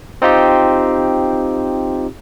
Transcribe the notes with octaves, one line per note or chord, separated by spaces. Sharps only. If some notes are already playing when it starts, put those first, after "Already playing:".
C4 D#4 F4 G4